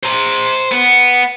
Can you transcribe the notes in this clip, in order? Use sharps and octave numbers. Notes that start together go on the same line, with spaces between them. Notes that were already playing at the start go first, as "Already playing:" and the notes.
C5 A#5
B3